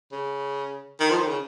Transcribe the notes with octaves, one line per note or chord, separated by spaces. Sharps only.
C#3
D#3
F3
D#3
C#3